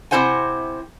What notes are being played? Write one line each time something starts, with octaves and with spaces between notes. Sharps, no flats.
C3 D#4 E4 C5 F#5 G#5